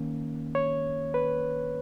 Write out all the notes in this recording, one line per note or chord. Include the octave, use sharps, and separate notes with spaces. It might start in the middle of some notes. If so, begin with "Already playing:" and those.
Already playing: D#3 A#3 C#4
C#5
B4